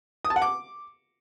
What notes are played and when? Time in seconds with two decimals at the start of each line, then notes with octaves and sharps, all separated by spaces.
0.25 D#6
0.30 A5
0.36 F#5
0.42 D6